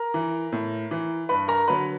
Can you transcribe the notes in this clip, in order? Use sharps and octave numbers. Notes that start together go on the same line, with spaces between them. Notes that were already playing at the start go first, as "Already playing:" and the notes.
Already playing: A#4 A#5
E3
A2
E3
G2 B4 B5
A#4 A#5
D3 F#3 B4 B5